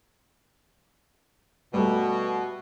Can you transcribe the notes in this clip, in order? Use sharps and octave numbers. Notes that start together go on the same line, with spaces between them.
B2 G3 A3